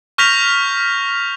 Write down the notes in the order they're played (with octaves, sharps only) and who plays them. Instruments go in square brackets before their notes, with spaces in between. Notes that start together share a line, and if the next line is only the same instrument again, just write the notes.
[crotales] C#6 F6 G6 A#6 B6 F7